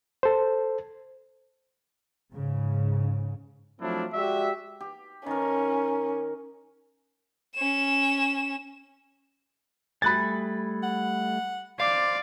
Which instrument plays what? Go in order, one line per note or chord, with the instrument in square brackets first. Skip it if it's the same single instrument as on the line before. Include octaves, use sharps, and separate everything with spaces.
[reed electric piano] A4 C5
[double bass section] G#2 C#3
[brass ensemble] F3 F#3 A3 C4 D4 E4
G#3 F#4 G4 D5 E5
[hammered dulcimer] G4
[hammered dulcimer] D#3 A#4 [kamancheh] C#4
[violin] C#4 E7
[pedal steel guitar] G3 A3 G#5 [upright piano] B5 F#6 A6
[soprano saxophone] F#5
[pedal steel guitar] C5 [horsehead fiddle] D5 [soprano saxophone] F5